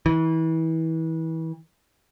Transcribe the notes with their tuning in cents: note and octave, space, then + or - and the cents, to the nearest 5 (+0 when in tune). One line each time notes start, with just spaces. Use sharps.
E3 -30